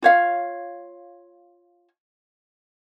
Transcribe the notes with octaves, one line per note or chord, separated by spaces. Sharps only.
F4 C#5 F5